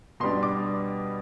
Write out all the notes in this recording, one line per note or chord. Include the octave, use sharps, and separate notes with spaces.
B2 G3 D4 C6
D6